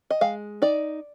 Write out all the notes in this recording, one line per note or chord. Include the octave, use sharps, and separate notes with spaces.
D#5
G#3 F5
D#4 D5